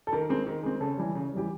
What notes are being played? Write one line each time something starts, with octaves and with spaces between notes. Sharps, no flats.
A4
D#3 A#4
G#3 C4
D#3
G#3 C4
C#3 A4
E3 G3
C#3
E3 G3 G4